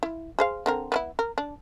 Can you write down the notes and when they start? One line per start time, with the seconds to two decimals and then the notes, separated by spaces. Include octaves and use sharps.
0.03 E4
0.39 G#4 C5 F5
0.66 D3 C4 A#4
0.92 B3 C#4 E4
1.19 A#4
1.38 D4